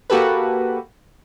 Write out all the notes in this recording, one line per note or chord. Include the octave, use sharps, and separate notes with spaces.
A#3 F#4 G4 A4 B4